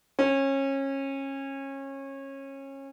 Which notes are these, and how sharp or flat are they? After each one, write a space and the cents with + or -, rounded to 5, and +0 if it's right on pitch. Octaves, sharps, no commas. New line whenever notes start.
C#4 -25